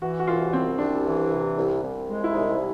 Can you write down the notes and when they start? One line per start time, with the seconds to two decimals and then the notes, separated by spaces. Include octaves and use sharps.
0.01 E3 F#4
0.19 F#4
0.27 C2 F4
0.53 C2 C4
0.78 C2 D4
1.05 E3
1.31 C3
1.57 C2
1.82 C2
2.08 G#3
2.24 E4
2.33 C2 D#4